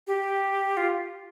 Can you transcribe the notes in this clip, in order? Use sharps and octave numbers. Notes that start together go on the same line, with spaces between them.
G4
F4